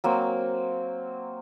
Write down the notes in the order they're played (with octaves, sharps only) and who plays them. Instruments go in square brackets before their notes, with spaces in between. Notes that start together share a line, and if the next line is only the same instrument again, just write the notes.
[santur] F#3 A#3 C4